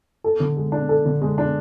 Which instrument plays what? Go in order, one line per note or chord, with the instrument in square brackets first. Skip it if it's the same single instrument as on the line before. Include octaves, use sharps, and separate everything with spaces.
[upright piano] A4
D3
G#3
D4
A4
D3
G#3
D4